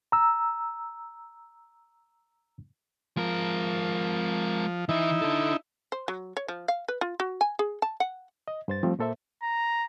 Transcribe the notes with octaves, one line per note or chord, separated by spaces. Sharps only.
A#5 E6
F3 G#3 A#4
E3 D#4 E4 E5
D4 A4
C5
F#3
C#5
F3
F5
B4
F4
F#4
G#5
G#4
A5
F#5
D#5
G2 C5 A6
F3 G3 A3 C4
A#2 A#3 A4 C5 E5
A#5